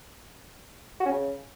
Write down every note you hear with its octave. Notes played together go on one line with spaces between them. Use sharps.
F#4
C#4
C#3